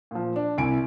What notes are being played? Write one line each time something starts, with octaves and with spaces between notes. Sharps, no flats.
A#2 F3
D4
C2 E4 G#5 D7